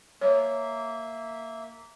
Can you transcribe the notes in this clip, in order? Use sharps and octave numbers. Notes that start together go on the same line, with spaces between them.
A#3 C#5 E5